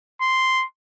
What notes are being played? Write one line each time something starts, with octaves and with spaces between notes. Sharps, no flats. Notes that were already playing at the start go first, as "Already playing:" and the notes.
C6